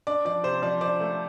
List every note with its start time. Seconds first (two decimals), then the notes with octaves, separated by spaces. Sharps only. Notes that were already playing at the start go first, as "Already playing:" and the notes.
0.07 D4 D5
0.25 F3 D5
0.43 C3 C5
0.62 F3 D5
0.81 F3 D5
1.00 A3